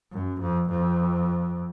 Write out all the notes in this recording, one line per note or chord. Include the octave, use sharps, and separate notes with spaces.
F#2
F2
F2